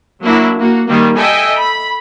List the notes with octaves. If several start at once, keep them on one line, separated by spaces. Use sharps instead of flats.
F#3 A#3 D4 E4 F#4
A#3 F#4
D#3 G3 A#3
A4 D#5 E5 G5 G#5
B5